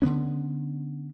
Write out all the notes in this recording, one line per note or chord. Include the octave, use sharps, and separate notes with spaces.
D3 D#3 B3 C#4